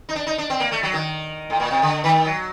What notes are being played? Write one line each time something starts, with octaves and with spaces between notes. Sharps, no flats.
D#4
D4
D#4
D4
C4
A#3
A3
F#3
D#3
A2
A#2
C3
D3
D#3
F#3